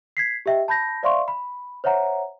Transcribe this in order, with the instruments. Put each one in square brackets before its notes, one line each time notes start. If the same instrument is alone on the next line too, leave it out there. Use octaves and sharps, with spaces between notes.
[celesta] G#6 B6 C7
G4 D#5 E5 G5
A5 B5 G6 A#6
C5 D5 E5 F5 C6 C#6
B5
C5 C#5 E5 F#5 A#5